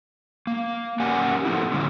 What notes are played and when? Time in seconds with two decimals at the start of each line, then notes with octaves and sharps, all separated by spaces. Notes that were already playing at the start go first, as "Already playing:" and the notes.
0.47 A#3
1.00 C#4 G4 A#4 D5 F#5 G#5
1.45 F3 A3 B3 C4 E4
1.72 A2 D3 G3 C#4